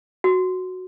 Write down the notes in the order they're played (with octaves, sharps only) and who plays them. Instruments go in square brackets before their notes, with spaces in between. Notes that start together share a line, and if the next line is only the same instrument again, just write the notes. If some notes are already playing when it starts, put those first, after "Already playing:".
[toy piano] F#4